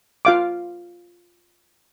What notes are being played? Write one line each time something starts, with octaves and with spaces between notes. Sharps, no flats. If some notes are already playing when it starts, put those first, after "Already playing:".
F4 F5 D6